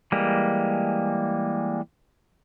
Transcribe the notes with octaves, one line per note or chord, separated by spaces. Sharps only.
E3 G3 G#3 A#3